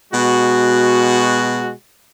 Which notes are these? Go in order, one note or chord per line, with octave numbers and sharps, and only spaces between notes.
B2 G#3 F#4